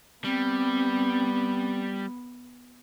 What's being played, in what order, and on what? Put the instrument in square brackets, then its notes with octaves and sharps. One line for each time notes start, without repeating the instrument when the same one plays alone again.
[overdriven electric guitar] G3 [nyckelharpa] B3 [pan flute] C4